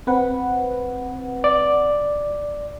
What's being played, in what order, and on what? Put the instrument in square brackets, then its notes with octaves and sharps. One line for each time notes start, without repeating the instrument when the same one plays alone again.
[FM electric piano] C4 B4 F#5
[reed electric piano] D5